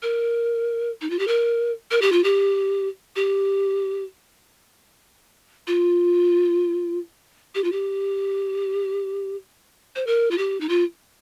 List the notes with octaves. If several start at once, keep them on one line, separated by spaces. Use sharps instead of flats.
A#4
D#4
F4
G4
A#4
A#4
G4
F4
G4
G4
F4
G4
F4
G4
C5
A#4
F4
G4
D#4
F4